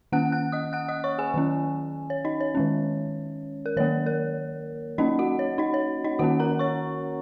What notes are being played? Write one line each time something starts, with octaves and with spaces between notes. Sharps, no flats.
D#3 A#3 C#4 F#5 F#6
F#5 F#6
D#5 D#6
F#5 F#6
D#5 D#6
C#5 C#6
G#4 G#5
D#3 F#3 C#4
C#5
D#4 D#5
C#5
D#3 G#3 C#4
A#4
D#3 F#3 A#3 C#5
A#4
F#3 A#3 C#4 D#4 D#5
F#4 F#5
C#5
D#4 D#5
C#5
D#4 D#5
D#3 A#3 C#4 F#4 F#5
A#4 A#5
C#5 C#6